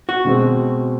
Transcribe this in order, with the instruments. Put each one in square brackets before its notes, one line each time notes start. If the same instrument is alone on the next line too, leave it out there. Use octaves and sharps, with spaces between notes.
[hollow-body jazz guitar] F#4
[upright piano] B2 G#3 C4